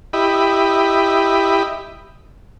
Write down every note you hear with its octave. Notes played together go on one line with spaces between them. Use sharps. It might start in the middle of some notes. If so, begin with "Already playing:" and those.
E4 G4 D#5 B5